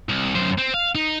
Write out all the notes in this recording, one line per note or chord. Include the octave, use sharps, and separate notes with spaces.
C2
F#2 C5
C4
F5
D#4